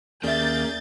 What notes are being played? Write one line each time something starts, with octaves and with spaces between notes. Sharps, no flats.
D#2 A#3 C#4 G#4 D5 E5 G6 A6